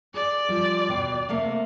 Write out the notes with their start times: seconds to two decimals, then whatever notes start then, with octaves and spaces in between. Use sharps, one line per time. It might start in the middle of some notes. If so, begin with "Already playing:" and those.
0.14 G#4 D5
0.49 F3 G3
0.88 D#2 B2 G5
1.29 C3 A3 A#3